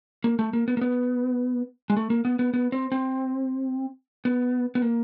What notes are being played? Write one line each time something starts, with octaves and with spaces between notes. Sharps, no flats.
A#3
A3
A#3
B3
A#3
B3
G#3
A3
A#3
B3
B3
B3
C4
C4
B3
B3
A#3